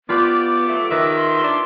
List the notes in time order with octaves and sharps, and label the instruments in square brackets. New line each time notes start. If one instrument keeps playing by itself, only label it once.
[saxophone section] B3 [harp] F4 G4 B4 [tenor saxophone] D5
[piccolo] D6
[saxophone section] F#3 A3
[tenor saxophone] D#3 [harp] B4 [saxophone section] E5
[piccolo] C6
[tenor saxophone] D4